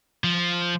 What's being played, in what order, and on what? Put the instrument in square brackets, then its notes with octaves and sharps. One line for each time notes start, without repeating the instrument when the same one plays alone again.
[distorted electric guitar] F3